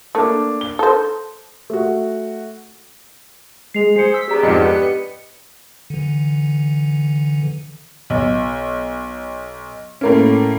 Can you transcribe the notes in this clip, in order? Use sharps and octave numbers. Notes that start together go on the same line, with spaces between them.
A3 A#3 D4
G7
A4 C5
A3 F#4
G#3 C7 F7
G#4 C5 C7 C#7
E6 B6
B3 D4 G4 G#4 A#5
F2 G#2 D#5 C#7
B4
D3 E3
B1
A2 A#3 C#4